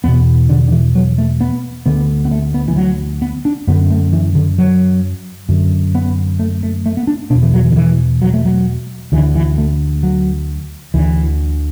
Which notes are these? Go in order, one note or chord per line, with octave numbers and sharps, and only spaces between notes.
E2 B2 B3
D3
D3
E3
F#3
A3
B3
D2 D3 B3
B3
A3
B3
E3
F#3
B3
D4
F#2 D3 B3
A3
E3
D3
F#3
F#2 D3
B3
A3
A3
A3
B3
D4
E2 B2 D4
E3
F#3
E3
D3
E3
F#3
A3
F#3
D2 D3 E3
E3
A3
F#3
D2 D3 E3